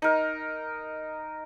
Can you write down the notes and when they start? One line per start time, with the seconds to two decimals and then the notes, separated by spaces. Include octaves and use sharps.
0.02 D#4 A#4